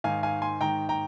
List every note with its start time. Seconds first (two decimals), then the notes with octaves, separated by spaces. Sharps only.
0.04 G#2 D#3 F5 G#5
0.23 F5 G#5
0.42 G#5 C6
0.61 G#2 D#3 G5 A#5
0.89 G5 A#5